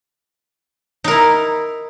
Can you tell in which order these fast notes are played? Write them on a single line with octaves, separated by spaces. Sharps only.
D#4 A#4 E4